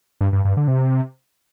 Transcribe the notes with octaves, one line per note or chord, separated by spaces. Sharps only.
G2
G2
G2
D3
C3